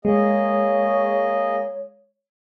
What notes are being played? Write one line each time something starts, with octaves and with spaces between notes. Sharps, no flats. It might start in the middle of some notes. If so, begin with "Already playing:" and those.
G#3 A#3 G#4 C#5 D#5